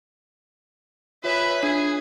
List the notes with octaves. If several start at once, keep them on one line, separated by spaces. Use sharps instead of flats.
D#4 F4 G#4 B4 C#5 E5
D4 G#4 G#5